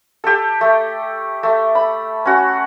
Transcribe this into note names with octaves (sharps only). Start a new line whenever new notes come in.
G4 A4
A3
A3
B5
C#4 F#4